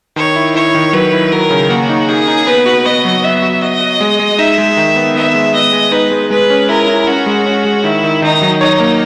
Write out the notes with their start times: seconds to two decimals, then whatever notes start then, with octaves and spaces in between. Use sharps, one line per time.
0.16 D#3 C#5
0.36 E4
0.55 E4 C#5
0.75 D#3
0.93 F#3 B4
1.13 E4
1.32 F#3 A#4
1.51 C#3
1.70 A#3 F#4
1.89 D#4
2.09 D#4 G#4
2.28 D#4
2.47 B3 B4
2.66 F#4
2.85 B3 D#5
3.05 F#3
3.23 B3 E5
3.42 F#4
3.62 F#4 D#5
3.81 F#4
4.00 G#3
4.20 G#3
4.38 D#4 E5
4.58 G#3
4.77 D#3
4.96 B3
5.15 B3 E5
5.34 G#3
5.54 B3 D#5
5.73 G#3
5.92 D#4 B4
6.11 G#3
6.30 G#3 B4
6.50 C#4
6.69 E4 A#4
6.88 E4
7.07 C#4 F#4
7.26 G#3
7.46 C#4
7.65 G#3
7.84 D#3 E4
8.04 D#3
8.22 D#3 D#4
8.42 F#3
8.61 D#4 C#5
8.80 A#3